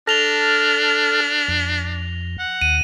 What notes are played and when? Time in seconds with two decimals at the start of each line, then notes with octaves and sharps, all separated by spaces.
0.07 D4 A4 A5 F6 A#6 F7 G7
1.48 F2
2.39 F#5
2.62 D#2 D#7